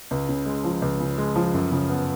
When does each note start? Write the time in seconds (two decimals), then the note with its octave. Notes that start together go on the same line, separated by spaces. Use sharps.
0.11 C#2
0.29 C#3
0.46 G#3
0.64 F3
0.82 C#2
1.00 C#3
1.18 G#3
1.36 F3
1.54 F#2
1.71 C#3
1.90 B3